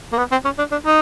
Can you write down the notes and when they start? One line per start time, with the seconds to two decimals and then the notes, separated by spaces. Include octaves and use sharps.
0.12 A#3
0.18 B3
0.32 C4
0.45 C#4
0.58 D4
0.72 D4
0.86 D#4